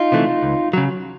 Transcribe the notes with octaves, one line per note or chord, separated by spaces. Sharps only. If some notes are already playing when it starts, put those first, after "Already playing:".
Already playing: D#4 F4
C3 E3 A3
C#2
C#3 F#3